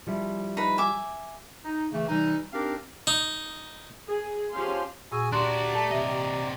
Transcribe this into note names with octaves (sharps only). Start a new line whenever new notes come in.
F3 G3 E4
D#4 B4
E5 G#5 D6
D#4
C#3 E3 A3
C3 E3 G3 D#4
C4 D4 D#4 G4 A#4 F5
D#4
G#4
F3 C#4 G4 F5 C6
A#2 F#4 G#4 G#5 E6
D4 F#4 G4 D5 A#5 C6 F#6
A3 A5
C3 D#5 E5